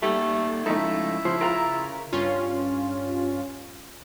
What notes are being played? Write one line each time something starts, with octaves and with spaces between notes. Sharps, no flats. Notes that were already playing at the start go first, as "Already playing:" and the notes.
G3 A3 A#3 D#4 E5
F3 G#3 A3 C#4 D#4 E4 A4
C#3 F3 G#4 C5
F4 A#4 F#5 A#5
G2 C#4 F4